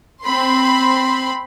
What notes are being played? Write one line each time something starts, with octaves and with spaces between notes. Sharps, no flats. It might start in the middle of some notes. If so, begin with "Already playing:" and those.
C4 B5 C6